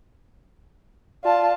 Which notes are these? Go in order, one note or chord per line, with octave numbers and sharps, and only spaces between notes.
F4 D5 A5